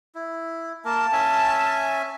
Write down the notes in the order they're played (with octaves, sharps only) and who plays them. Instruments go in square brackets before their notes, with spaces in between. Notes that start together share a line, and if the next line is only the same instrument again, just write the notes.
[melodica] E4
[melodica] A#3 A#4 [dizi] A5
[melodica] C#4 E5 G#5